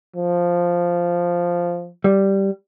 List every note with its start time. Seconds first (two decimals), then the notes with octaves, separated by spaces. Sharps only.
0.16 F3
2.04 G3